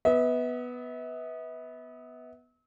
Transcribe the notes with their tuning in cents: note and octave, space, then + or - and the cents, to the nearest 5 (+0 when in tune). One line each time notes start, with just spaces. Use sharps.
B3 +0 E5 -40